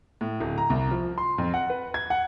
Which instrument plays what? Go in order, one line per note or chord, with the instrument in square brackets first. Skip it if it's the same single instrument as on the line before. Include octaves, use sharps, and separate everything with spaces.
[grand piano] A2
D1
A#5
C2
F3
C6
F2
F#5
B4
G#6
F#5